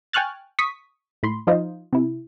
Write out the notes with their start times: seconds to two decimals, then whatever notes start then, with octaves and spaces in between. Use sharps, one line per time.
0.13 G5 G#5 C#6 F6 F#6 A6
0.59 C#6 D#6 B6
1.23 A2 B5 C6
1.47 F3 D#4 F4 C5 D#5
1.93 C3 E4